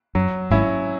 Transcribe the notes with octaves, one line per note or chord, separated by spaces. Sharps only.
F#2 F#3
G#1 G#2 C#4 E4